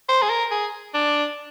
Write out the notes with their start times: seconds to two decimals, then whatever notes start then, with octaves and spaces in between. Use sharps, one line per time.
0.09 C5
0.22 G#4
0.30 A#4
0.51 G#4
0.94 D4